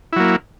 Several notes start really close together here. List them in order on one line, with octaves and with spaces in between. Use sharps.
E4 F#3 A#3